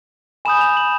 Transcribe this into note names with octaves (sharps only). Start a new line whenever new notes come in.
G#5 B5 D#6 G6 E7
F7
F#7